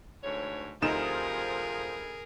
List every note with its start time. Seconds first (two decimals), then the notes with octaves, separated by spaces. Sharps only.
0.24 D2 G#2 C#5
0.82 D2 C3 F3 D#4 G#4 A#4 E7